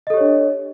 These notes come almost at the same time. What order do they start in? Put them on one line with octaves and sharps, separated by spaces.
D#5 A4 G4 C#5 D4